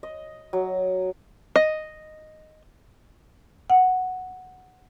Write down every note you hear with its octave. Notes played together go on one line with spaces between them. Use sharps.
D#5
F#3
D#5
F#5